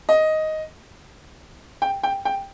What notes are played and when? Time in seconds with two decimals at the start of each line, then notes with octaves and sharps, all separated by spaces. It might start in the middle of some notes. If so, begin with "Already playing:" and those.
0.09 D#5
1.82 G5
2.03 G5
2.25 G5